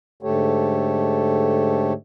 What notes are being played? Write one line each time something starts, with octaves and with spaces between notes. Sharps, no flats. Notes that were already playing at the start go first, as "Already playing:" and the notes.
G#2 D3 A3 G4 A4 C#5